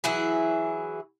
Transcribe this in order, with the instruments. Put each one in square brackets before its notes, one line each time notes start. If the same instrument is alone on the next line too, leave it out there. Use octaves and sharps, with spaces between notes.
[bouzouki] E3 F#3 E4 G#4